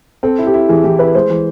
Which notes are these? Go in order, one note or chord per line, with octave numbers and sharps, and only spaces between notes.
C4 A4
E4
G4
E4
E3 G#4
E3 G4
E4 B4
G#3 C5
E3